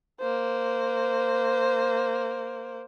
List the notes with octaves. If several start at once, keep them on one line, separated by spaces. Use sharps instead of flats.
A#3 C5